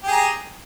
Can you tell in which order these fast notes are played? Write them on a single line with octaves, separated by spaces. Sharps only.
G4 G#4 A#5